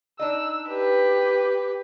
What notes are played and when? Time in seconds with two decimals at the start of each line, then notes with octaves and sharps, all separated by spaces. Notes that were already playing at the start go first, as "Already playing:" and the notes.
0.19 D4 D#4 D#5 E6
0.69 G4 B4